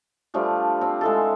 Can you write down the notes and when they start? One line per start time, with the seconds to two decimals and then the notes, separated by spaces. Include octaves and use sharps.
0.34 F3 G3 A3 D4
0.81 C4
1.01 G#3 E4 A4